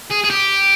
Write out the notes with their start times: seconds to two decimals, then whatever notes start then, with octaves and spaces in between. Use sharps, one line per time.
0.11 G#4
0.24 G#4
0.30 G4